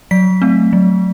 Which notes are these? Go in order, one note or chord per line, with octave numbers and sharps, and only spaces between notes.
F#3 B6
A3 C4
F#3